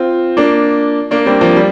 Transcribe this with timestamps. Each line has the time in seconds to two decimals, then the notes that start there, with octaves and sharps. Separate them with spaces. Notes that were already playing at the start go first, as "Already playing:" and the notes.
Already playing: C4 F4
0.37 A#3 D4
1.11 A#3 D4
1.26 G3 C4
1.41 F3 A#3
1.56 G3